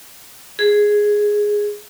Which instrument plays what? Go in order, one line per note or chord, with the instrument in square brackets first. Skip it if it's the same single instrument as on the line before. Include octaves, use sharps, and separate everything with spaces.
[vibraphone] G#4